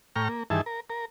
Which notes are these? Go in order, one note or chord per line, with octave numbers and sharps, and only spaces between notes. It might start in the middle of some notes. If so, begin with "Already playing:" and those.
A2 G5 A#5 C#6 F6
A#3
G2 D#3 E3 G#4 E5 A5
A#4
A#4